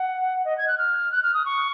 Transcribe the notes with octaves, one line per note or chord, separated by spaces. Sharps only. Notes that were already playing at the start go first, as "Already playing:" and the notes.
Already playing: F#5
D#5
G#6
F#6
F6
F#6
F6
D#6
C#6